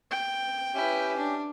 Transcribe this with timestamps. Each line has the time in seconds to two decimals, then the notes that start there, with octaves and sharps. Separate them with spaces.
0.11 G5
0.75 C#4 E4 G4 B4
1.16 D4